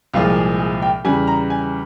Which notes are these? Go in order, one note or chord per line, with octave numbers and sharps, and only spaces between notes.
C2 A#2 F3 G#3 F4
G#4
G#4
G5
E2 C#3 G3 G#5
A#5
G#5